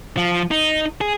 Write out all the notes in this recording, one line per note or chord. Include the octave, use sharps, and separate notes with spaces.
F3
D#4
G#4